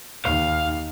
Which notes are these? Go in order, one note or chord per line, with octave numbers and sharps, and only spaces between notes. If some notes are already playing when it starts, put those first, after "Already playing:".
D#2 D#3 F5